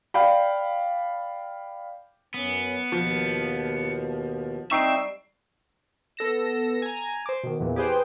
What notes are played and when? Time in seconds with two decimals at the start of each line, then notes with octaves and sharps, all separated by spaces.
0.14 D5 F5 G5 B5
2.34 F#2 B3 C#4
2.92 D#2 B2 F3
4.71 G3 C4 D#4 E5 C#6 C7 D7
6.17 B3 A4 A#6 E7
6.82 G#5 A#5
7.26 C5 D6
7.43 B2 D#3
7.60 E2 A#2 E3
7.76 G4 G#4 B4 C5 G5